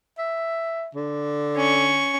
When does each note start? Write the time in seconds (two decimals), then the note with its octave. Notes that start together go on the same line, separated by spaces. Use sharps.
0.18 E5
0.95 D3
1.56 C#4 C#6